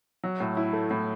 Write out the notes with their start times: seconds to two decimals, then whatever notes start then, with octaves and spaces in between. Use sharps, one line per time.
0.24 F#3
0.40 A2
0.57 E4
0.73 A3
0.91 A2